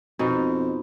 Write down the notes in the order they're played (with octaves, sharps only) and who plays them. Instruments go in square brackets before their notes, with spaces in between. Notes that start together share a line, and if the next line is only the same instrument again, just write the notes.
[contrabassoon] F2 [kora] B2 C4 D#4